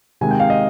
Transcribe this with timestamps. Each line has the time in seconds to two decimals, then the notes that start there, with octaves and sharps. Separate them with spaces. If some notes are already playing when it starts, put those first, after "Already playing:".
0.21 C3 D#3 G#3 G#5
0.31 G5
0.40 F5
0.50 D#5